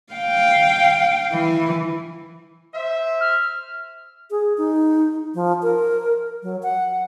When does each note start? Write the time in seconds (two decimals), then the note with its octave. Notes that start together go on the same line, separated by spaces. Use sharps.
0.13 F5 G5
1.33 E3
2.75 C5 E5
3.20 F6
4.31 G#4
4.58 D#4
5.34 F3
5.63 A#4
6.43 F#3
6.63 F#5